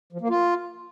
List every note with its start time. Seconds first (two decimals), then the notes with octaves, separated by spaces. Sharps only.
0.13 F3
0.21 A#3
0.30 F4